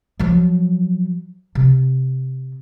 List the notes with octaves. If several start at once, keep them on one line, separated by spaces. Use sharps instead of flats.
F3 F#3
C3